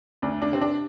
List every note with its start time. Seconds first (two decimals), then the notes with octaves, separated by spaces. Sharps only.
0.22 D2 D4
0.42 D4
0.52 C3 C4
0.61 D4